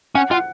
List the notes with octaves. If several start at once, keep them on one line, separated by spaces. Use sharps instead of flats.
C#4 F#5
F4 F#5